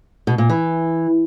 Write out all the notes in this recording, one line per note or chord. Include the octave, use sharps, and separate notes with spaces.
B2
A#2
E3